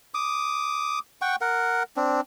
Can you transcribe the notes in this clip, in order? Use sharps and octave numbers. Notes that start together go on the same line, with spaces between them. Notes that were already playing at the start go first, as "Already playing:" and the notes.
D6 D#6
F#5 G5 C#6
A#4 F#5
C4 D4